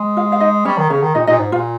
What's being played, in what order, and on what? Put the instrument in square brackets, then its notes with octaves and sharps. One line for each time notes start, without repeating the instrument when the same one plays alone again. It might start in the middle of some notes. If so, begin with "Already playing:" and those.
Already playing: [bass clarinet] G#3
[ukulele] F4 F5
F5
D#4 D#5
[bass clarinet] G3 [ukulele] C#4 C#5
[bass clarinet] D#3
[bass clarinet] C#3 [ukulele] C#4 C#5
[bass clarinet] D#3
[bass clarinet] A#2 [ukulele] D#4 D#5
[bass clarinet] A#2 [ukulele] D#4 D#5
[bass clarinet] G#2
[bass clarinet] A#2 [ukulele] F4 F5